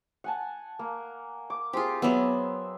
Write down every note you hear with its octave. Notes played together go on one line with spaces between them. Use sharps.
F#5 G#5 A5
A#3
D6
C4 F4 G4 G#4
F#3 B3 E5